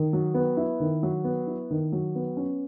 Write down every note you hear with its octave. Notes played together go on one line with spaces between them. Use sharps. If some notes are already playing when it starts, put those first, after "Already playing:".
Already playing: D#3
F#3
B3
E4
D#3
F#3
B3
E4
D#3
F#3
B3
C#4